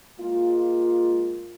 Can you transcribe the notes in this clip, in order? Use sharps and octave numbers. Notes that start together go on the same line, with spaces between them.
G#3 A#3 F4